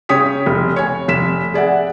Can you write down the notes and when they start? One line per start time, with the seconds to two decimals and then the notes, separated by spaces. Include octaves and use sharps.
0.09 C#3 C#5 G5 D#6 B6
0.46 F1
0.76 C#5 G#5
1.08 F1 B6 E7
1.54 G#4 D5 E5 F#5